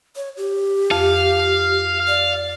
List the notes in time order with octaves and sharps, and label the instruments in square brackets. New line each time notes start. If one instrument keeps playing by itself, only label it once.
[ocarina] C#5
G4
[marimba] F2 [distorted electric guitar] F5
[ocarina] D5